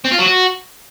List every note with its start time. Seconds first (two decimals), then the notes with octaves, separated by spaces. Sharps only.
0.05 C4
0.12 F4
0.19 F#3
0.26 F#4